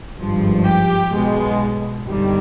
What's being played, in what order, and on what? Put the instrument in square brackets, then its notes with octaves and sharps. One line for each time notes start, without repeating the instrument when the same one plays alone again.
[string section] G#1 G2 F3
G4
B1 B2 G#3
G1 G2 D#3 G3